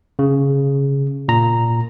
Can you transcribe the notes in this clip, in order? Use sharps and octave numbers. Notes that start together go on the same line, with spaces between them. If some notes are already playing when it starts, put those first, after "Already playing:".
C#3
A#2 A#5